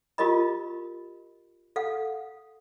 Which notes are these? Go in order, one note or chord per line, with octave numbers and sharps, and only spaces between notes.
F4 G4 A#4 D#5 B5
A4 F5 F#5